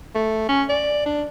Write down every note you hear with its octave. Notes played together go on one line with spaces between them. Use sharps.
A3
C#4
D5
D4